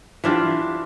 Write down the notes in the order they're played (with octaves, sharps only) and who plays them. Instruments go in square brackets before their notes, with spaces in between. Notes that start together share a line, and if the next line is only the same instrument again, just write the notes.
[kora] E3 D4 F4 G4